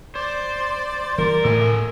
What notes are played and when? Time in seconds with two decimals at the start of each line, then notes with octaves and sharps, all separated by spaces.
0.15 C5 D5
1.18 E3 F#3 G3 A#4
1.45 A2 A4 E5 G#5